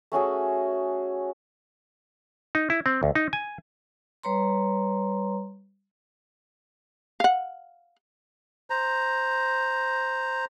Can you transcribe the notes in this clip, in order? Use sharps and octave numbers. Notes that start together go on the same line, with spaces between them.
A3 C#4 F#4 G#4
D#4
E4
C4
D2
D#4
G#5
G3 B4 C#5 A#5 C6
F5 F#5
C5 A#5